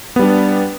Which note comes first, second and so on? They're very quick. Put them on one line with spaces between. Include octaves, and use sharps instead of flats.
B3 G3 D4